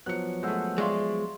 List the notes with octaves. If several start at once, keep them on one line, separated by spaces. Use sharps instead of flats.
F3 F#3 B3 F#6 C#7
G#3 A3 F#5 E6 G6
G#3 D5 E5 F5 C6 C#6